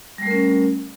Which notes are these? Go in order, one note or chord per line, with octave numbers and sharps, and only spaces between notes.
G3 A3 C#4 A#4